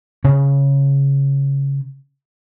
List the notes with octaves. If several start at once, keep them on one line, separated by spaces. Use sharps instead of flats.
C#3 C#4